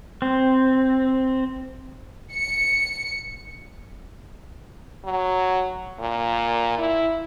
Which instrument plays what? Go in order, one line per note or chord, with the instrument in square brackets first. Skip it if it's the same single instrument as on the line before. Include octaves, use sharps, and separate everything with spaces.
[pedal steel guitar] C4
[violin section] C#7
[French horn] F#3
A#2
E4